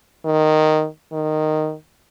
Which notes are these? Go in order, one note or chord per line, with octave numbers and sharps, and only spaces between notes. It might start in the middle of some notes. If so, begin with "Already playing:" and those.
D#3
D#3